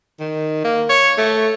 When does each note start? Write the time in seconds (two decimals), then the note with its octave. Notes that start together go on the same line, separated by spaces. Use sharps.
0.20 D#3
0.65 A#3
0.89 C#5
1.18 A3